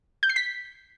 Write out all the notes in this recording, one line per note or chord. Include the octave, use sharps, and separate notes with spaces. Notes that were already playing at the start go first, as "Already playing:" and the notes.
G6
C7
B6